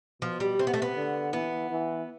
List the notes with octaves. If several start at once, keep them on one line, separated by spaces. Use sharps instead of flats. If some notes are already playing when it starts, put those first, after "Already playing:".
B2 F3
G3
C3 C4
B3
A3
B3
D3
E3 B3
E3